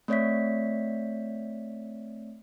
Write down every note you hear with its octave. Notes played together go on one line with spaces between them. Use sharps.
A3 C4 C#5 D5 E5 B6